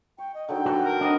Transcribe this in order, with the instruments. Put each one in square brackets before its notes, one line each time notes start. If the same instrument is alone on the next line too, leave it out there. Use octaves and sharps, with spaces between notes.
[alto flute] G5 [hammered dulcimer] C#6
[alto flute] D#5
[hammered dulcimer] D3 D#3 F#3 [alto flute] G5
[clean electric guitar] F#4 [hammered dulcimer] A4 B4 D#5
[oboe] A#4
[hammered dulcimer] C4 A#5 [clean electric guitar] D4 F#4 D#5